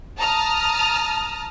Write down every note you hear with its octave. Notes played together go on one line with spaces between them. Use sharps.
A5 A#5 D#6 F6